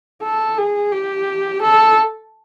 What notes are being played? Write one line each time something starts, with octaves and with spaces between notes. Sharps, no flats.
A4
G#4
G4
A4